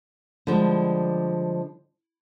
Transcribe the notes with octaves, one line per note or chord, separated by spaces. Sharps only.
D3 F3 G3 G#3